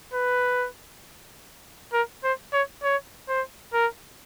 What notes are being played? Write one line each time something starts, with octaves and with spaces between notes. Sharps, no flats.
B4
A#4
C5
C#5
C#5
C5
A#4